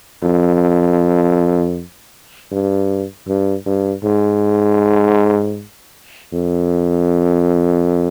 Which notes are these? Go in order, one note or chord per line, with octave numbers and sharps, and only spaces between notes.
F2
G2
G2
G2
G#2
F2